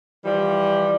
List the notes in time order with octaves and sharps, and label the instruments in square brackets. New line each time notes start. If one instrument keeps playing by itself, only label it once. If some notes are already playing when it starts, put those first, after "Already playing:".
[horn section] E3 F3 G3